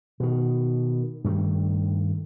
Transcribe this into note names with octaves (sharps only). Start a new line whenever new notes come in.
B2 D#3
G2 D#3 A3